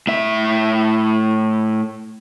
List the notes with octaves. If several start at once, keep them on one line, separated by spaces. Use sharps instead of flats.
A2 E5